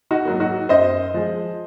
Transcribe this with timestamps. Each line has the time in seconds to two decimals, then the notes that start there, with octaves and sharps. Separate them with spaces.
0.11 D#4 F#4
0.25 G#2 F#3 A#3
0.40 D#4 F#4
0.69 F#2 C5 D#5
1.14 F3 G#3